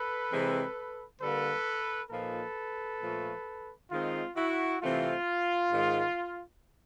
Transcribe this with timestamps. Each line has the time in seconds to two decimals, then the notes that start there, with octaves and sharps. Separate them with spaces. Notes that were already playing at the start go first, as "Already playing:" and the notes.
Already playing: A4 B4
0.31 C3 E3 G#3 C4
1.21 D3 G3 A#3 A4 B4
2.11 A#2 F3 A#3 D#4 A4 B4
3.01 A#2 F3 A3
3.91 D#3 G#3 C4 D#4 F4
4.36 E4 F#4
4.82 C3 E3 A3 C4 F4
5.72 G#2 D#3 G#3